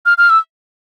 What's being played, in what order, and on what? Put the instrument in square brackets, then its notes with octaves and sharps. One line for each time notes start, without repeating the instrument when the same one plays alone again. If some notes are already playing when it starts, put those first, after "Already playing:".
[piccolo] F6
F6
E6